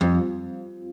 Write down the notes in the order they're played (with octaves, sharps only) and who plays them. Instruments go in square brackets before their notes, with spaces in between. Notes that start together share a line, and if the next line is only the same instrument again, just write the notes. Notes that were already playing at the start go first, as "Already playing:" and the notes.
[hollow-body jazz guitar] F2 [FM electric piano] G3 C4 F4